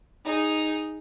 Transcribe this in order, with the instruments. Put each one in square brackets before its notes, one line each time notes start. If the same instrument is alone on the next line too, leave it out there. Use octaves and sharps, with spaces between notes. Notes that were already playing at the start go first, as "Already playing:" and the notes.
[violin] D#4 G#4